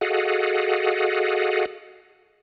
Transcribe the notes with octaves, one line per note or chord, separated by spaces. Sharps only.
F#4 G#4 A4 D#5 F5 F#5